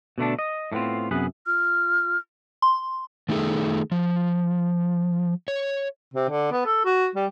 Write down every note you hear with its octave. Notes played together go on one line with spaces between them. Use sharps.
B2 D3 A3 D4
D#5
A2 A3 B3 C4 F4
F#2 C3 B3 G#4 B4
F4 F6
C6
D#3 A3 D#4 G#4 A4
F3
C#5
C3
D3
B3
A4
F#4
G3